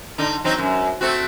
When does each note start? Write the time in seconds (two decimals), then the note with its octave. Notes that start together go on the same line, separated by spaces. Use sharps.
0.18 D3 D#4
0.44 F#3 C4 D#4
0.58 F#2
1.01 A3 C4 F#4